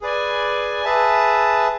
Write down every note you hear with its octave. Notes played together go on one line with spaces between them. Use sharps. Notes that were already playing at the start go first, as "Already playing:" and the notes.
G#4 B4 D5 G#5
G#4 B4 E5 A5